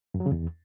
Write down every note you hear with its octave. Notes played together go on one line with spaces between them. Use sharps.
F#2
F#3
C#3
E2